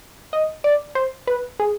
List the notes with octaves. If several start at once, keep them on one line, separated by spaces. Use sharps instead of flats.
D#5
D5
C5
B4
G#4